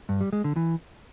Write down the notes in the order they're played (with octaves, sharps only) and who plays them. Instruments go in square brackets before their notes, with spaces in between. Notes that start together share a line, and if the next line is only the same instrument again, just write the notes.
[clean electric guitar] G2
G3
G#3
D3
E3